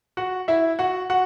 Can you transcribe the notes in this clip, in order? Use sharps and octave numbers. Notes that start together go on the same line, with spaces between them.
F#4 F#5
E4 E5
F#4 F#5
F#4 F#5